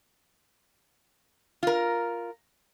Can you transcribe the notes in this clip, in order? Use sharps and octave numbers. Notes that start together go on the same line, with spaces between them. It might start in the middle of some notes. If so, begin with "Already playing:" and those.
F4 A#4